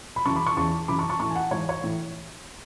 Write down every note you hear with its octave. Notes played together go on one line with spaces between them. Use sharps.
B5
F#2 C#3 E3 A5 C#6
B5 D6
A5 C#6
E2 C#3 E3 A5 C#6
F#2 C#3 E3 B5 D6
A5 C#6
A5 C#6
A2 E3 A5 C#6
G#5
F#5 A5
G#2 E3 C#5
C#5
A2 E3